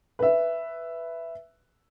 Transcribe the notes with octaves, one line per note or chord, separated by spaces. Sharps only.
B4 E5